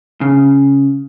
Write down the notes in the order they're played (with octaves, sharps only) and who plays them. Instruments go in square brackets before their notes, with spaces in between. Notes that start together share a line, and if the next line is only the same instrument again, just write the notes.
[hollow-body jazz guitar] C#3